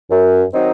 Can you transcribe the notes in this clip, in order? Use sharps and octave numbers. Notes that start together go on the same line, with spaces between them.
F#2
D#3 F#3 C4 D#4